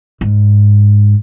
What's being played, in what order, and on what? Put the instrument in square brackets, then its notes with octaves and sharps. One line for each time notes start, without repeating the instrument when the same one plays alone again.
[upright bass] G#2